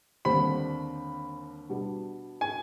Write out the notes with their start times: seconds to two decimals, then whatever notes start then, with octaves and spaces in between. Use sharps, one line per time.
0.25 D#2 D3 G3 C4 B5
1.70 B2 G3 B3 D4
2.41 G#5